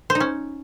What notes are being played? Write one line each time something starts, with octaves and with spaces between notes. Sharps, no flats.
C5
D#4
C#4